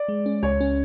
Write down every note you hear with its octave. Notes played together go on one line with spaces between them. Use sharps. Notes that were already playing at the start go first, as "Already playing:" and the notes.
Already playing: D5
G#3
C#4
C#2 C#5
C#4